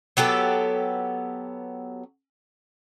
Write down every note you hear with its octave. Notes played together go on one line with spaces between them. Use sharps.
F#3 B3 G4 A4